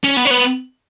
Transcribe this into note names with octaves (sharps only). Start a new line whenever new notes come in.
C#4
B3
C#4
B3